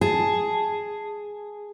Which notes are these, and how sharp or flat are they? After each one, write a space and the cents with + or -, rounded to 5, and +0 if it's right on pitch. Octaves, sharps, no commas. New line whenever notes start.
G#4 +0 A5 +0